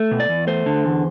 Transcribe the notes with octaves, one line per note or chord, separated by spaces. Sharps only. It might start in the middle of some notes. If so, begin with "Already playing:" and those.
Already playing: A3
B2
D5
E2
A3 C5
D3
E2